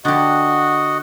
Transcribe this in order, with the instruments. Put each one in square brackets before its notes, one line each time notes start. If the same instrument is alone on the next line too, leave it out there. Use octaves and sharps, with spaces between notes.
[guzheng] D3 G4 [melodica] F#4 D#5 F#5